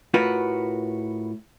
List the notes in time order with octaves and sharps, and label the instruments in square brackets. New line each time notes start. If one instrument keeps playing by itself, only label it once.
[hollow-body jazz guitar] A2 F4 F#4 A#4 B4